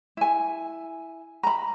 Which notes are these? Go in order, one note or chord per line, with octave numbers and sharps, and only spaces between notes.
E4 G#5
A#5 B5